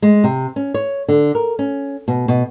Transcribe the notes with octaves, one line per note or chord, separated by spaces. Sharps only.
G#3
C3
C#4
C#5
D3
A#4
C#4
B2
B2